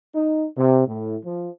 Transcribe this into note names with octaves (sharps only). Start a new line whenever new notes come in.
D#4
C3
A2
F3